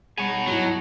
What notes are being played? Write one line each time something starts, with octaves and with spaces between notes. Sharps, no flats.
B2 G3 D#4 G#4 C#5 G#5
D#2 G#2 F#3 E4